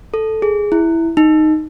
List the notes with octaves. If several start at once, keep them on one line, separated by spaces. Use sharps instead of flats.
A4
G#4
E4
D#4